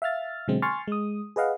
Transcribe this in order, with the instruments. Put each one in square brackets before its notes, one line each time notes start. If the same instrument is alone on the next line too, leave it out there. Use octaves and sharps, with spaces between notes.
[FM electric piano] E5 F5 F6 A6
B2 D3 F#3 G#3 C4
G#5 C6 C#6 F6 A6
G#3 D#6
G#4 B4 D#5 F5 F#5